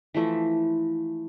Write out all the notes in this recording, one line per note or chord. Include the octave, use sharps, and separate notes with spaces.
E3 F3 A3 E4